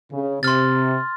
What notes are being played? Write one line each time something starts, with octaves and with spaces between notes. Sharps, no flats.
C#3
C3 C6 F6 A6